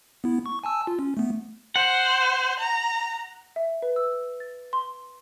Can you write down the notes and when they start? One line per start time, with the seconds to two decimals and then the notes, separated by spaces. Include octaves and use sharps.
0.24 B3 E4
0.46 C#6
0.64 G#5 A5 E6
0.87 F4
0.99 C#4
1.17 A3 B3
1.76 C5 F#5
2.59 A#5
3.56 E5
3.82 B4
3.96 E6
4.40 A6
4.73 C6